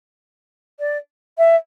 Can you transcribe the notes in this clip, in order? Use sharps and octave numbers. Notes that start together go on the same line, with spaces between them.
D5
E5